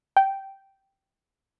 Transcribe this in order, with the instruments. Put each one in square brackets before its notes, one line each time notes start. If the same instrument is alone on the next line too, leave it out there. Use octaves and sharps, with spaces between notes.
[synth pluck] G5